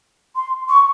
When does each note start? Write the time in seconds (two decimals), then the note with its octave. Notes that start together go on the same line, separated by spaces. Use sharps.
0.36 C6
0.69 C#6